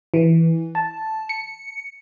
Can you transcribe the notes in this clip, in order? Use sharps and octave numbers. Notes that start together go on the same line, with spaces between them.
E3
A5
C#7